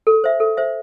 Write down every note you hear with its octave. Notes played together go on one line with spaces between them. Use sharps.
A4
C5 E5
A4
C5 E5